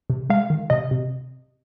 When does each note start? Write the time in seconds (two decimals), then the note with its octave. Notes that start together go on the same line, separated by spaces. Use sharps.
0.10 C3
0.30 G#3 F5
0.50 D#3
0.70 C3 D#5
0.91 C3